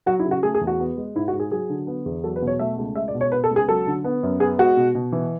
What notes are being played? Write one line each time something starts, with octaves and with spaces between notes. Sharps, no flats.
F#3 F#4
E4
C#3
F#4
A3 G#4
G#4
E2
F#4
B3
G#3
G#2 E4
F#4
G#2
G#4
F#3 G#4
D3
B3
E2
F#3 A4
B4
B2
C#5
A3 E5
C#2
G#3 E5
D5
B2
C#5
B3 B4
A4
C#2
G#4
F#3 A4
D3
B3
F#2
B3 G#4
G#3 F#4
B2
B2
E3